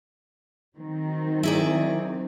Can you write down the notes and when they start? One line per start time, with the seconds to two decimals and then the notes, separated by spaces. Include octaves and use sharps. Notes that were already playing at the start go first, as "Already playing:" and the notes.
0.78 D#3 F#3 C4
1.43 E4 G#4 D5